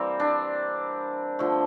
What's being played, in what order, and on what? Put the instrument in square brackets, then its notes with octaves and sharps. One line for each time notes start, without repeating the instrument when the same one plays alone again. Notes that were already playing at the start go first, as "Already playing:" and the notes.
Already playing: [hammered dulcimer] E3 G3 A#3 C4
D4
D3 F3 A3